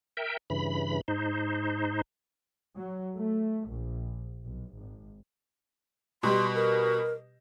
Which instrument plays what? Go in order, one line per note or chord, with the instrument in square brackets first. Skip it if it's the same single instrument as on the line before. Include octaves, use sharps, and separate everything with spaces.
[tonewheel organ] A#4 E5 G5
G2 C#3 E3 B5
G#2 D#4 C5
[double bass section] F#3
A3
A#1
B1
G#1
[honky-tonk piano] B2 G3 G4 [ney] C6
[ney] A#4